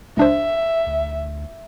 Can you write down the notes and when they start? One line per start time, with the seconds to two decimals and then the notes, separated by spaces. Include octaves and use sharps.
0.17 C#2 D4 C5 E5
0.87 D2